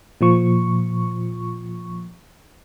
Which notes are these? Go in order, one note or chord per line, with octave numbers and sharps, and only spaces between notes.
A#2 F3 C#6